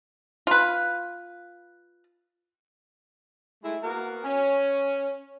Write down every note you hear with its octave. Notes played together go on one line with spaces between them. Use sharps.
F4 B4
G#3 A3 E4
A#3 B3 F#4 A#4
C#4